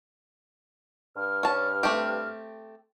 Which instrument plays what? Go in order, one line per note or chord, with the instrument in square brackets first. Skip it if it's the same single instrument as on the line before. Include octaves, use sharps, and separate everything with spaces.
[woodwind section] G2 F6
[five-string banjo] C#4 A5
A3 C4 G4